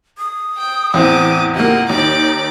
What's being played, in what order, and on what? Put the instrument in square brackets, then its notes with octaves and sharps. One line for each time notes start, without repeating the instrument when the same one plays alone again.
[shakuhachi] D#6
[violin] G5
[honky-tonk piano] E2 [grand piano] A2 C4 [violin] D6 D#7
[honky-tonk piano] C#2 A#3 [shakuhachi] G4 [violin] D#5 F#5
[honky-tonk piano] D#2 [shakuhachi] D#4 [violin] D5 D6